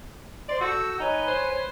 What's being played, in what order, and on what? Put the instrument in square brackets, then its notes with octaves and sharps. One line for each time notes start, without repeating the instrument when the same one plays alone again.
[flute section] C5 C6 [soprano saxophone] D5
[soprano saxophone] F#4 [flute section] A4 E6 G6
[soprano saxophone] D#4 [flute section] B4 C#5 G#5
[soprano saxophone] C5